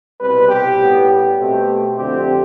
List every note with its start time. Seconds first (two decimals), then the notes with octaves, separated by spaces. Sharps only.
0.20 C2 B2 G3 C4 B4
0.49 G4
0.79 A2 G3 B3
1.09 G4
1.38 B2 A3 C4
1.97 F2 D3 A3 C4 G4